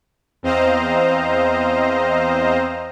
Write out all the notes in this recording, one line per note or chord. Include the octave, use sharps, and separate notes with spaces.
E2 C4 C5 D#5 F5 A#5